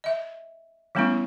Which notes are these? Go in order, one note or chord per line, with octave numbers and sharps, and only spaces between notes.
D#5 E5
E3 G3 A3 B3 C#4 E4